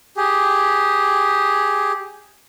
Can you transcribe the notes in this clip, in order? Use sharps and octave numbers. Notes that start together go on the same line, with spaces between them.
G4 G#4